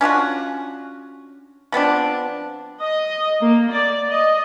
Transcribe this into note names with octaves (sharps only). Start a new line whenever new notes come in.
C#4 D4 F4 F#4
F3 B3 C4 D4
D#5
A#3
D5
D#5